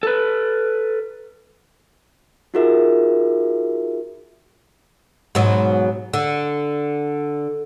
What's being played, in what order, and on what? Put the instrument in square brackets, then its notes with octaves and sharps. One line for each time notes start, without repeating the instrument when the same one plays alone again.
[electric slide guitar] A4 B4
[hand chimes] D#4 F4 F#4 G#4 A#4 E5
[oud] G#2 B2 F#3
D3